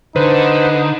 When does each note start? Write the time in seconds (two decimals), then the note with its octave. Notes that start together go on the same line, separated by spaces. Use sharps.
0.16 D3 D#4 B4 C5